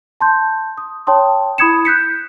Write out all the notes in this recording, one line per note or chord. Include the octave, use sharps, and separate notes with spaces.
A5 C6 G6
D#6
C#5 G5 A5 C6 D#6
E4 B5 D#6 G#6 C#7 E7
F#6 G6 B6 C#7